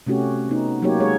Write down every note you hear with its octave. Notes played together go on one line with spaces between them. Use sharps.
C3 A3 C#4 F#4 G4
B3 D#4
F#3 A#3 D#4 F#4 G4 C#5
G#3 G#4 C#5